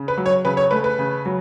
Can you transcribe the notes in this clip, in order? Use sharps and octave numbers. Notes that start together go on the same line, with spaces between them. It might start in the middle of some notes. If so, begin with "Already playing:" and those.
Already playing: C#3
B4
F#3
C#5
C#3 B4
C#5
A3 B4
B4
C#3
F#3